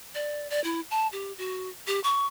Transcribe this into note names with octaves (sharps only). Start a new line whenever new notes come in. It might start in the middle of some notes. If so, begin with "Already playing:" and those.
D5
D5
E4
A5
G4
F#4
G4
C#6